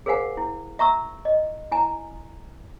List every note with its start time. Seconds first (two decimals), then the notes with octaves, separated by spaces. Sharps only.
0.06 G#4 A#4 C5 F5 F#5 G#5
0.37 E4
0.79 E5 A#5 C#6 E6
1.25 D#5
1.71 E4 G#5 A#5